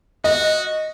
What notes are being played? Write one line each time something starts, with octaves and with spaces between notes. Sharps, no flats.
F#4 D#5